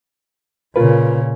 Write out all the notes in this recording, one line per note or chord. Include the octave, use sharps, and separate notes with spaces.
A#2 C#3 F4 A#4 B4